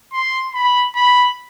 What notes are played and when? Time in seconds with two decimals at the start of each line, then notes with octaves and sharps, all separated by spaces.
0.13 C6
0.54 B5
0.95 B5